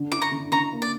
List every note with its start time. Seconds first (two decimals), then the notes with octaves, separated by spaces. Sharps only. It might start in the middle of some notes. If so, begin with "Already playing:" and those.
Already playing: D3 D4
0.12 E4 D6
0.22 A#5 C#6
0.32 D3
0.52 D3 A#5 C#6
0.72 A#3
0.82 D5